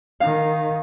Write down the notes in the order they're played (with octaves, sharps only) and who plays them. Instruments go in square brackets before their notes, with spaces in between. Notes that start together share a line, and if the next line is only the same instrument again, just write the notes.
[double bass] D#3 [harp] F5